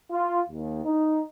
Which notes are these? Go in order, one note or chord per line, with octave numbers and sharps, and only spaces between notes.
F4
D#2
D#4